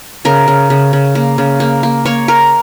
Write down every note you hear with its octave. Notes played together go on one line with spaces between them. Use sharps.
C#3 A#4
C#3
C#3
C#3
A#3
C#3
A#3
A#3
A#3 C#5
A#3 A#4